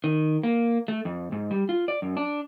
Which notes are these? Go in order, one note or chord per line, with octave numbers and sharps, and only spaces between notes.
D#3
A#3
A3
F2
G#2
G3
F4
D5
F#2
D4